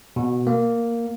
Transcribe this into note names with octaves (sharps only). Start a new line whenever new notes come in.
B2
A#3